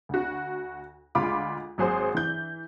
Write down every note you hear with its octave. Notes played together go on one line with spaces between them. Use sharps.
D2 F#4
D2 G#3 F4 B5 D6
G#1 F#3 G#4 C5
E3 G6